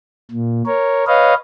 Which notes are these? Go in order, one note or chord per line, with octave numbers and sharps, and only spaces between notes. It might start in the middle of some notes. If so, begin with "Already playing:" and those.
A#2
A#4 C#5
B4 C#5 D#5 F5